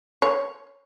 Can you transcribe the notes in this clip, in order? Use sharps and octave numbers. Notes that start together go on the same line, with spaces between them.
C#5